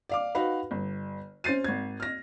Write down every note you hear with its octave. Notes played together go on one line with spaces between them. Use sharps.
D5 F5 D6
D#4 F#4 B4 F5 B5
G1
C#4 C5 A6 C7 D#7
G#1 G#6
F6 A#6